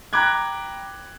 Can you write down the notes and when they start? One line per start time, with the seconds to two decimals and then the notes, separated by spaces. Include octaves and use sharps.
0.13 G5 A#5 B5 D6 F#6 G#6